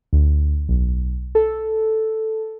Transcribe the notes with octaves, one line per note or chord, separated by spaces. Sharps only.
D2
B1
A4